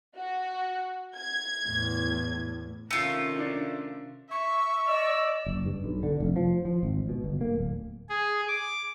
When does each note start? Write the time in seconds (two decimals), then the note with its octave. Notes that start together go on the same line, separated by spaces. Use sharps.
0.17 F#4
1.17 G#6
1.65 E2 A2
2.91 C3 D#3 A3 C#4 F4 C#7
3.39 D4
4.30 E5 C#6
4.88 D5 D#5 E6
5.46 F#1
5.65 G2
5.84 B1
6.03 D3
6.20 F1
6.36 F3
6.65 F3
6.83 G#1
7.09 B2
7.24 G1
7.41 A#3
7.55 D1
8.09 G#4
8.48 D6